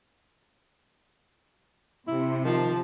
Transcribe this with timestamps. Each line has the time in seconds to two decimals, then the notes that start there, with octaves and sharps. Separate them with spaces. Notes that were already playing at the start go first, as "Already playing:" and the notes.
2.08 C3 E4
2.44 D#3 F3 A5